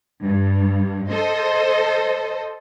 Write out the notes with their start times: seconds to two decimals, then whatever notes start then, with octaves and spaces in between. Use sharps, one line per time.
0.24 G2
1.09 A4 C5 D#5